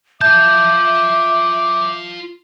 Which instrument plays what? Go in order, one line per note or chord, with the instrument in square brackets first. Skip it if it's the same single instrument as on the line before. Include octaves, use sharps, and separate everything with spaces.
[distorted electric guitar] F4 A5 [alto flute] E5 [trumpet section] D6 [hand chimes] G6